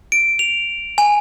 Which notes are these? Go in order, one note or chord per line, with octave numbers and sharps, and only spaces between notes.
D7
F7
G#5